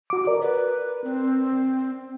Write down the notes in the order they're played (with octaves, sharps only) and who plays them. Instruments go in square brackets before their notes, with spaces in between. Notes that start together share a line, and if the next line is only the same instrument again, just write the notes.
[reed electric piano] F#4 D6
A#4 D5
[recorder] B4
C4